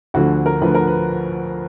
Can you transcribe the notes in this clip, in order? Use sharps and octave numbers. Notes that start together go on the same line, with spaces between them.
D2 D3 F3 F#4
A#4
D2 D3 F3 B4
A#4
B4